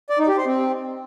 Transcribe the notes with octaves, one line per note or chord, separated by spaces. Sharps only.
D5
D#4
G4
C5
C4